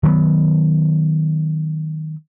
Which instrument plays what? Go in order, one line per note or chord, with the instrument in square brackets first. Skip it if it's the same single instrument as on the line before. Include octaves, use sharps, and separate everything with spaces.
[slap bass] D#3 F#3 A3 B3